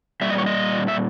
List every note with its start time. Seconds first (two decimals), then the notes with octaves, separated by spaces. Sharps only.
0.21 A#2 G3 E5
0.30 D#5
0.38 C#5
0.46 D#5
0.88 E5